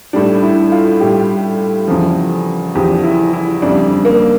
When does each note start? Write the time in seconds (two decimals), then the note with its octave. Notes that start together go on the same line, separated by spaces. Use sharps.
0.13 A2 G3 D4
0.43 E4
0.72 F4
1.00 A2 G3 G4
1.88 E2 C#3 F3
2.75 E2 C#3 F3 G4
3.03 E4
3.33 E4
3.62 F2 C#3 G3 D4
4.05 A#3